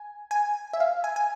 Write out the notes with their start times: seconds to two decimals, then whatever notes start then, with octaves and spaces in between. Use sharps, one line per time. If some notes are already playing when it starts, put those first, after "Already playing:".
Already playing: G#5
0.31 G#5
0.73 E5
0.80 F5
1.04 G#5
1.16 G#5